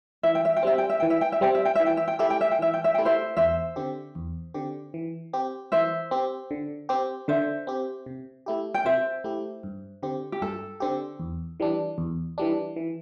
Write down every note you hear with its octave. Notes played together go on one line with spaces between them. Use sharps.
E3 E5
G5
E5
G5
G3 C4 E5
G5
E5
E3 G5
E5
G5
E5
G3 C4 G5
E5
G5
E3 E5
G5
E5
G5
A3 E4 G4 E5
G5
E5
G5
E3 E5
G5
E5
A3 E4 G4 G5
C5 E5
E2 C5 E5
D3 C4 G4
E2
D3 C4 G4
E3
C4 G4
E3 C5 E5
C4 G4
D3
C4 G4
D3 C5 E5
C4 G4
C3
A3 E4 G4
G5
C3 C5 E5
A3 E4 G4
G2
D3 C4 G4
G4
G2 A4
D3 C4 G4
E2
E3 G3 D4
E2
E3 G3 D4
E3